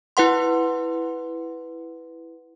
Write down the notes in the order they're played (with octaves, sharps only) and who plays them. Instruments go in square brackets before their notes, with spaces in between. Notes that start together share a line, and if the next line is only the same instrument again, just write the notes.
[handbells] E4 B4 F#5 C6